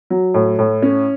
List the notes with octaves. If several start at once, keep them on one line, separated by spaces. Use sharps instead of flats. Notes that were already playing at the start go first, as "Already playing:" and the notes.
F#3
A2
A2
C#4